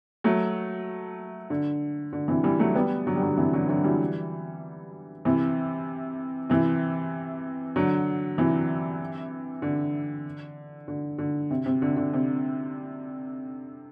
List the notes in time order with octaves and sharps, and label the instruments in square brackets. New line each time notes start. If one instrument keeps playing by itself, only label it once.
[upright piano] F#3 A3
D3
D3
C3 E3
E3 G3
F#3 A3
G3 B3
D3 F#3
G3
D3 F#3
C3 E3
D3 F#3
D3 F#3
E3 G3
C3 E3
C3 E3
D3 F#3
C3 E3
D3
D3
D3
C3
C3
D3
D3
C3